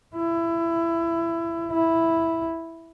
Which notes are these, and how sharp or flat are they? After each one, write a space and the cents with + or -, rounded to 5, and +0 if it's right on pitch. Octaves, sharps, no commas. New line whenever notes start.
E4 +20
E4 +0